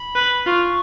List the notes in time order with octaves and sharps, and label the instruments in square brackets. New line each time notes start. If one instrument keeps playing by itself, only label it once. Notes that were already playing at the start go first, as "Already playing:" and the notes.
Already playing: [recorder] B5
[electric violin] B4
[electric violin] F4 [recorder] C#6